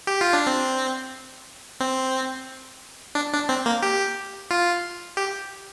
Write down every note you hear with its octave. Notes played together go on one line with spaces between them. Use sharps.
G4
F4
D4
C4
C4
D4
D4
C4
A#3
G4
F4
G4